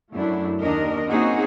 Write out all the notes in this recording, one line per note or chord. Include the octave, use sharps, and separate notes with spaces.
F#2 A3 D4 E4
D#2 D#3 D4 A#4 D#5
A#3 C4 C#4 D#4 F#4 G#4